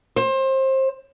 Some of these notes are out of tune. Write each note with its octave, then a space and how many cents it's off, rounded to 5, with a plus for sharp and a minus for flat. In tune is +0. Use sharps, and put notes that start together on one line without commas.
C5 +25